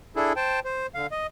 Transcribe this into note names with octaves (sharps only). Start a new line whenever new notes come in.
D4 E4 G#4 A4
C5 G5 A5
C5
D3 F5
D#5